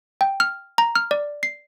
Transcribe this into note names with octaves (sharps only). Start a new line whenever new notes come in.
G5
F6
A#5
F6
D5
C7